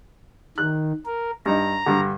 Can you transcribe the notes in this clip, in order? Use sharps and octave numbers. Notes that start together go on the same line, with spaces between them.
D#3 F#6
A#4
G2 D#4 A#5
G2 D3